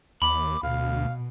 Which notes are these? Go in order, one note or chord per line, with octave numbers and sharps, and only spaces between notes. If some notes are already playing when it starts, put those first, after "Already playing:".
D#2 B5 D6
D2 B2 F5